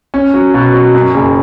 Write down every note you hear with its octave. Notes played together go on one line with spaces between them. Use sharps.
C#4
F#3
B2
F#3
F#2
F#1